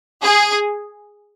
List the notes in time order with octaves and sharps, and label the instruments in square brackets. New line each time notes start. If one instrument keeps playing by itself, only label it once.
[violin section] G#4